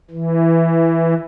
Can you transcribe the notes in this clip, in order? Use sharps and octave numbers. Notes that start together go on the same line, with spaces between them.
E3